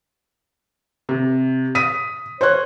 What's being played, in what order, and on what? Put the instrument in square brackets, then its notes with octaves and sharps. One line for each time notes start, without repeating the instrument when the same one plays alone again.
[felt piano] C3
D#6 B6 D#7
[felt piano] C5 F#6 [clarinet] C#5